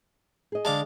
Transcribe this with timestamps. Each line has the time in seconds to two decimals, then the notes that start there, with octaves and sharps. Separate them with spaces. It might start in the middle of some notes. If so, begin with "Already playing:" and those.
0.52 G#4 D#5
0.65 D3 G#3 D5 F5 A5 D6